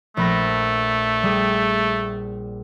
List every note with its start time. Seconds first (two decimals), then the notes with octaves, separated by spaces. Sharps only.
0.17 A#1 A3 B5 A#6
1.23 G3 G#4